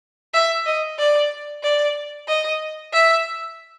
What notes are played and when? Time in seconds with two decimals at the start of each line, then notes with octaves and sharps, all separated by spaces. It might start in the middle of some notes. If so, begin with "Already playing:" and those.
0.34 E5
0.66 D#5
0.99 D5
1.63 D5
2.28 D#5
2.93 E5